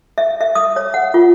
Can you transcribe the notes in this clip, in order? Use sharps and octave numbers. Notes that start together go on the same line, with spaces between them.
E5
E5
D#6
C#5
F#5
F4